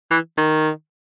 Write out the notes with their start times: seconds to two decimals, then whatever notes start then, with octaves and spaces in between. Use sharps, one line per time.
0.10 E3
0.37 D#3